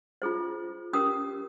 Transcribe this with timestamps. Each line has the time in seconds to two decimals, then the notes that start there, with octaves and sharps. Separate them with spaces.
0.22 F4 G#4 C5
0.93 C#4 G4 A#4 D#6